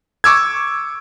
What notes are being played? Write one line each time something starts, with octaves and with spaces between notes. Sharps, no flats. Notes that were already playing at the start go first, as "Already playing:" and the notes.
C#6 D6 E6 G#6